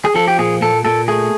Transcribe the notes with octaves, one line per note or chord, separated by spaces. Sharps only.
G#4
F3 A4
G4
A#2 G#4
A#2 A4
A#2 A4
A3 G#4